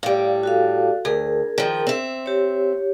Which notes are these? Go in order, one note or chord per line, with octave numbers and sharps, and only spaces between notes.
A2 G3 D5 F5
F#4 A4 F5
D2 G#4 A#4
D#3 F3
C4 E5
G4 C#5